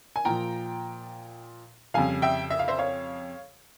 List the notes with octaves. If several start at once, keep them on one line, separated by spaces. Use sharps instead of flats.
G#5
A#2 F3 G5 A#5
F2 C#3 G3 F5 G#5
E5 G5
E5
F5
C5 E5
C#5 F5